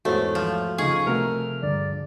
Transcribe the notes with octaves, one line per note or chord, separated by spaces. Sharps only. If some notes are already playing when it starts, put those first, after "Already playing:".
G#1 E2 A3 F#4 C5 C#5
F3
C#2 C#3 D#4 F4 G#4 C#6
C3 A3 F#4 A#4 F6
C#2 G2 D3 D5